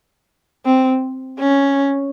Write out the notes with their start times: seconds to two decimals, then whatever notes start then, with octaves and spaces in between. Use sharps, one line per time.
0.65 C4
1.39 C#4